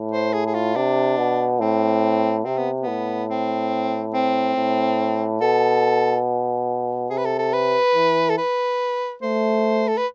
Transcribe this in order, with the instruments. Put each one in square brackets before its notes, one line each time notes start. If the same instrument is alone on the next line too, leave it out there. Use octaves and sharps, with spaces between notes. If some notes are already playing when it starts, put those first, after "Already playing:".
Already playing: [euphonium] A2
[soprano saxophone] C5
G#4
G#4
F4
[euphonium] C3 [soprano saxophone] D4
[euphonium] B2
[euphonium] A2 [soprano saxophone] C4
[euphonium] C3 [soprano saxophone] C4
[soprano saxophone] B3
B3
[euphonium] A2
[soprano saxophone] C4
C4
[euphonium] A2
[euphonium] B2 [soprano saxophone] A4
[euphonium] C3 [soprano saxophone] G#4
[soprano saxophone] B4
A4
A4
B4
[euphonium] E3
[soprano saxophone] A4
B4
[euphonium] A3 [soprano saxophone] C5
[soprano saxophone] A4
B4